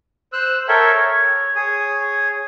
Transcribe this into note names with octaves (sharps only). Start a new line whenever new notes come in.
C5 E6 F#6
A4 A#4 C#5 E5 G5
C#5
G#4 C#5 D#6